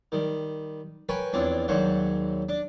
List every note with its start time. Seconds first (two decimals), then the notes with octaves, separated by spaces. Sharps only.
0.12 D#3 G3
1.09 A#4 B4 C#5 G5 G#5
1.33 E2 F3 C4 D4 C#5
1.68 D#2 G#2 F#3 G3 C5 C#6
2.49 D4